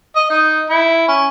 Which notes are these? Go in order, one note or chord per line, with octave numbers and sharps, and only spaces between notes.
D#5
D#4
E4
C#4